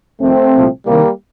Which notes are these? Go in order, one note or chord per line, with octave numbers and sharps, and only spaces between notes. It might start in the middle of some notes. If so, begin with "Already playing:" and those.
F2 D#3 A3 C4
C2 A#2 F3
C2 C3 D#3 G3 A#3